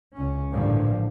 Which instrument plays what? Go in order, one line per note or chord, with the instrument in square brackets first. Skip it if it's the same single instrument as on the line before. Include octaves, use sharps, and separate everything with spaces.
[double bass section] C#2 C#4
A1 G2 A#2 D3 F3